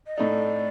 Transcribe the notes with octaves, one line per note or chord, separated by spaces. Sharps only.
D#5
A2 A3 D#4 D5